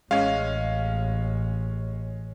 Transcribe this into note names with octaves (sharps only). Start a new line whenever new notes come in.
A1 G#3 C#4 F5